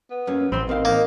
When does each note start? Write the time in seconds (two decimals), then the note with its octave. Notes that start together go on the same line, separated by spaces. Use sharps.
0.10 B3
0.27 F#2 A#3 C#4
0.52 A1 C4 B5 C6
0.69 D#3 C4 F5
0.85 A#3 D#4